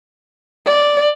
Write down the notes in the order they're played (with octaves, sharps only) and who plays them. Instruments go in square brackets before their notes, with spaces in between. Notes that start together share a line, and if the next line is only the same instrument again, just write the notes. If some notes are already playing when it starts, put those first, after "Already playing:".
[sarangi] D5